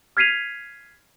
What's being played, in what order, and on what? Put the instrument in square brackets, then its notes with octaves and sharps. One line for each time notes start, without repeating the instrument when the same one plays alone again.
[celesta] F6 G#6 B6 C7 D#7 F7